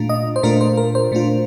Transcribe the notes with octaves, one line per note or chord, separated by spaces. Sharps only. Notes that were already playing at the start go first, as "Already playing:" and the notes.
Already playing: A#2 A3 D4 F4
D#5
C5
A#2 A3 D4 F4 A#4
C5
A#4
C5
A#2 A3 D4 F4